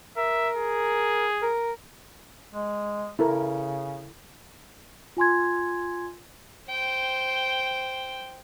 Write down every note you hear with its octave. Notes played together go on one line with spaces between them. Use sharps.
A#4 E5
G#4
A#4
G#3
C#3 E4 A4 A#4
F4 G#5 C6 G#6
C5 G5